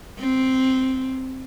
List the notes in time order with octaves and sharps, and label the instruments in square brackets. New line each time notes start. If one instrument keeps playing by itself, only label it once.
[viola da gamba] C4